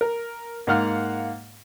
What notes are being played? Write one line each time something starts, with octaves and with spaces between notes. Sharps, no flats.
A#4
G#2 A#3 F5 F#5 F6